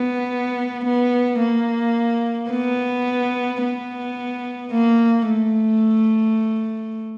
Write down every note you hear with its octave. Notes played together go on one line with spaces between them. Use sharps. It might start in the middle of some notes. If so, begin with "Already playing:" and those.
Already playing: B3
B3
A#3
B3
B3
A#3
A3